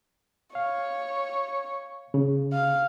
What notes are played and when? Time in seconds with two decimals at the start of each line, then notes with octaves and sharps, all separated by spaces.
0.55 C#5 F5
2.14 C#3
2.52 F5